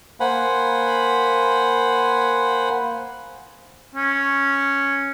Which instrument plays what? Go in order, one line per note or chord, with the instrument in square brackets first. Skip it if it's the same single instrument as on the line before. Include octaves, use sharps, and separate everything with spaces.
[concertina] A#3 C5 F#5 G#5 B5
[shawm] C#4